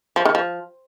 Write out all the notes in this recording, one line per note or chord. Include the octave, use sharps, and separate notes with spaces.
F3
D#3
F3